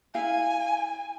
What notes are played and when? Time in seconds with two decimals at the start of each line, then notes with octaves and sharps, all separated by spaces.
0.15 E4 F5 G#5